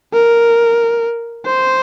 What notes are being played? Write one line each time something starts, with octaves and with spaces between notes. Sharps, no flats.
A#4
C5